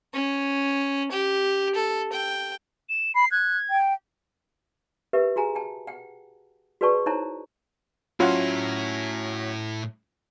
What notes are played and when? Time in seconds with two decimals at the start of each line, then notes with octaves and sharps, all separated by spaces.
0.14 C#4
1.12 G4
1.75 A4
2.13 G5
2.89 E7
3.15 B5 C7
3.31 F#6 G#6
3.70 G5
5.13 G4 A#4 B4 E5
5.36 F#4 G#4 G#5 A#5
5.55 G5 A5
5.87 F#5 G5
6.81 F#4 G#4 B4 D5 A5 C#6
7.06 D#4 E4 C5 C#5 A5 A#5
8.20 A2 F#3 C#4 E4 F4 F#5